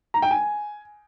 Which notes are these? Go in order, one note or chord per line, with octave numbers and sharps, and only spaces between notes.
A#5
G5
G#5